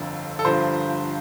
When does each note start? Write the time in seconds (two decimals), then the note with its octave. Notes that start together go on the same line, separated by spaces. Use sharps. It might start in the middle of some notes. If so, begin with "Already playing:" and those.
Already playing: G1 F2 D3
0.39 A4
0.45 G1 G2 F3 C5